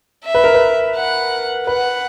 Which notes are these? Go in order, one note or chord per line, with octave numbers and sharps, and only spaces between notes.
E5
B4
A#4
B4
F#5
B4 F#5